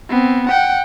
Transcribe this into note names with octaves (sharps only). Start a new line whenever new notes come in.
B3 C4
F#5 G5